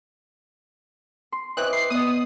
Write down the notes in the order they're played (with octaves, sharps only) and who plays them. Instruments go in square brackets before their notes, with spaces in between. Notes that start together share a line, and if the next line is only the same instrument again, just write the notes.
[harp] C6
[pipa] E3 C4 C#4 [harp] D#5 E5 D6 [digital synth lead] F#6
[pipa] B4 [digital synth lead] C7
[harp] B3 D#5 [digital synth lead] D#6